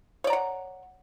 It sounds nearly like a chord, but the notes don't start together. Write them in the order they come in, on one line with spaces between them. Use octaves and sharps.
C#5 D5 A#5 F#5